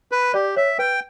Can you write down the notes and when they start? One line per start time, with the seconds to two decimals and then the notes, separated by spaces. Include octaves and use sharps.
0.12 B4
0.34 G4 D5
0.57 C#5 E5
0.79 B4 G5